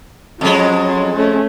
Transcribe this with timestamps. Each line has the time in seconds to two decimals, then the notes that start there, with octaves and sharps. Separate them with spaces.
0.41 F2 F#3 G#3 C#4
1.16 A3 C#4